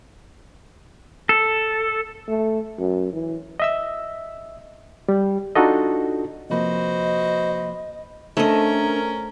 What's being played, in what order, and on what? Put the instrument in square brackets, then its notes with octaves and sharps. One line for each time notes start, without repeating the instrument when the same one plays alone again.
[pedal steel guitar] A4
[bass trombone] A3
F#2
E3
[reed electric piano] D#5 E5 E6
G3
D4 D#4 F4 F#4 A4 D#5
[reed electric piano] C3 F3 A#3 [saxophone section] F#4 B4 C5 [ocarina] D#5
[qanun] A3 D#5 [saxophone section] C#4 A#4 [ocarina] D4 [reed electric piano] C5